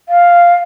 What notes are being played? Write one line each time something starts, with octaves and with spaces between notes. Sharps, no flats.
F5